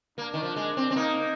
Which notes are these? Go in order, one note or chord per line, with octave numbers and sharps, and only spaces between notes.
A#3 D4
D#3
F3
G#3
C4
C4
A#3 D#4